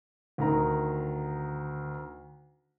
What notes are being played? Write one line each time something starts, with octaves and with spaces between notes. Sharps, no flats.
D2 D#3 A#5